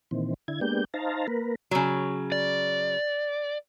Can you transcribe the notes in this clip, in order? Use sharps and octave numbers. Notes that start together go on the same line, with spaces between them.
A#2 D#3 E3 C4
D3 E4 G#6
G#3 A#3 B3 D4 G4 G6
D#4 C5 F5 A5 A#5
A#3 A#4 B4
C#3 F#3
D5